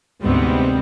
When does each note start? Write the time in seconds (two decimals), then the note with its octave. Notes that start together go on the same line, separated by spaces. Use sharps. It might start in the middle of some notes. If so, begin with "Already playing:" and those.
0.23 D2 G#2 C3 G3 B3 C4